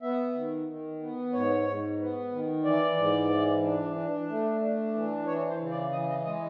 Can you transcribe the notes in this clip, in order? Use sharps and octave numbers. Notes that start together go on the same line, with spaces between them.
B3 E5
D#3
D#3
B3
G#2 C#5
G#2
B3
D#3
E3 D5
G#2
E3
D4
D4
A3
D4
E3
E3 C#5
C5
C#3
D5
E3 D#5
D#5
G#3 D#5